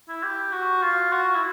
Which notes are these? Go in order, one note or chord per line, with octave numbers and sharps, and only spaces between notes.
E4
G4
F#4
F4
F#4
E4